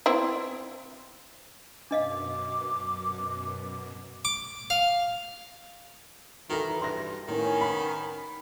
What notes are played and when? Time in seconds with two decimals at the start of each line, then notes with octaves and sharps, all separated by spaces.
0.06 B3 C4 E4
1.91 F#2 B2 D4 D#5 F5 D6
4.25 D6
4.70 F5
6.50 D#3 E3 F#4 A4 A#5
6.81 G2 C6 A#6
7.28 A2 D#3 B3 C#4 A#4
7.61 B5